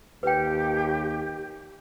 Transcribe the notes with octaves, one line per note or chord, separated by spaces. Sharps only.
D#2 G4 B4 G5